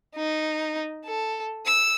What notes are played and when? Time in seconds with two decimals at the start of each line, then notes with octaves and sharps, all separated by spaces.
0.16 D#4
1.05 A4
1.66 E6